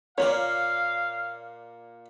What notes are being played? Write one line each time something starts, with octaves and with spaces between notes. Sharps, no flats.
A#2 A#3 C#5 D5 F5